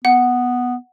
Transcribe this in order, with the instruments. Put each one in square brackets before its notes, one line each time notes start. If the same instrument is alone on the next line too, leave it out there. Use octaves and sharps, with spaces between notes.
[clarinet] B3 [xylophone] F#5